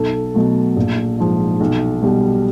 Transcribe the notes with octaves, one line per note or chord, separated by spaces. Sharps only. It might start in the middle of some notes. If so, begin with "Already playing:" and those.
Already playing: B1 A4
B2 F#3 A3
A#1
G#2 F3
B1
B2 G3